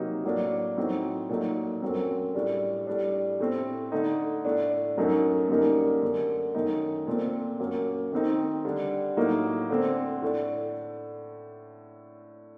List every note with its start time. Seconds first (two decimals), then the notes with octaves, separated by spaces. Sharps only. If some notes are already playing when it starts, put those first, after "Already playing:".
Already playing: C3 F#3 A#3 D#4
0.24 A2 F#3 A#3 D4
0.77 A2 F#3 C4 D#4
1.29 A#2 F#3 A3 D#4
1.82 F#2 F#3 A3 C4
2.35 A2 G3 D4
2.87 A2 G3 D4
3.40 A2 A3 C4
3.92 D3 A3 D#4
4.45 A2 A3 D4
4.97 F#2 F#3 A3 D#4
5.49 F#2 D3 G3 A#3 D#4
6.02 F#2 D3 A3
6.55 F#2 D#3 A3 D#4
7.07 A#2 A3 C4
7.60 F#2 F#3 A#3
8.12 D#3 A3 C4 D#4
8.65 D3 G3 D4
9.17 A2 F#3 A#3 D#4
9.70 D3 A3 C4
10.22 A2 A3 D4